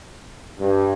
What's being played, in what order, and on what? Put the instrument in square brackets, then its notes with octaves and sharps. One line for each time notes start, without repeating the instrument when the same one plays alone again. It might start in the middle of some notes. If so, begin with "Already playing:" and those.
[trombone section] G2